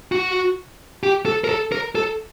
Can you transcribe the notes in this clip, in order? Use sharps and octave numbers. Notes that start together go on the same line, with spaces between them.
F#4
G4
A4
A#4
A4
A#4
A4